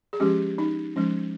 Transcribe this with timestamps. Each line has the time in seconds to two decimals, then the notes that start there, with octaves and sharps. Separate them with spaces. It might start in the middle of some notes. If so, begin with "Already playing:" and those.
0.13 G#4
0.20 F3 G#3 C#4 G4
0.58 D#4
0.96 F3 G#3 C#4